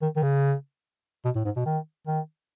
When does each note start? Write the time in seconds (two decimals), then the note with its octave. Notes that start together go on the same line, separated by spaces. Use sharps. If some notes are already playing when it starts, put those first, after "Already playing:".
0.02 D#3
0.16 D#3
0.23 C#3
1.25 B2
1.36 A2
1.45 G#2
1.56 B2
1.66 D#3
2.07 D#3